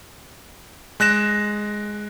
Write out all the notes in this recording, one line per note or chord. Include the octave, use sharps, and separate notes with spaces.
G#3 F#6 A#6 E7